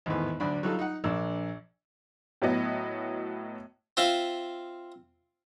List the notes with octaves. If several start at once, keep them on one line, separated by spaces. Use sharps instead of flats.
G#1 E2 A2 B3
D2 F#3 D4 B5
F#3 G3 D#4 F4 A4
D#4 F#5
A#1 A#3 D4 E6
A2 F#3 B3 D#5
C4 F4 E5 F5